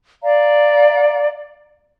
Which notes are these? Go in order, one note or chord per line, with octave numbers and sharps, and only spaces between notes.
D5 F5 A#5